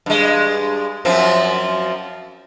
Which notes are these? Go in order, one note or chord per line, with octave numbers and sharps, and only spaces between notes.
G2 G#3
F#2 F3 C4